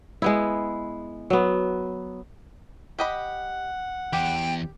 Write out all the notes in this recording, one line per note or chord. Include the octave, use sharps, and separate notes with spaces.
G#3 B3 E4
F#3 B3
G4 D#5 F#5 B5
E2 G4 G5